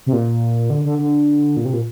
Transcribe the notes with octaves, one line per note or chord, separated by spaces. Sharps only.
C3
A#2
D3
D3
D3
A#2
C3
A#2